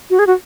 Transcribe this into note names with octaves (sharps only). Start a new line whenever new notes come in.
F#4
G#4
F#4